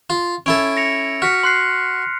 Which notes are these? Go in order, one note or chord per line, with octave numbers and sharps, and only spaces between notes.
F4
C#4 E4 A4 D7
A#6 C#7 F7
F#4 F6 B6 C#7
C6 F#6 C7